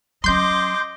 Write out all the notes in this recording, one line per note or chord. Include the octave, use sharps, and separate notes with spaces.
F#3 C#4 D#5 C6 D6 G6